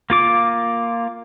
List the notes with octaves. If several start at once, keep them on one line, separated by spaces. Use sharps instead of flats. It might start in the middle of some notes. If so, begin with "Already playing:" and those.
A#3 F4 D6